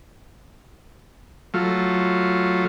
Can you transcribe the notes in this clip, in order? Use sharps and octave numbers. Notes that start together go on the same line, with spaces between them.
F#3 A3 F4